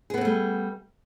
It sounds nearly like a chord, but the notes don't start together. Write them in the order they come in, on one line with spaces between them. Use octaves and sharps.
G#4 B3 C4 A3 G3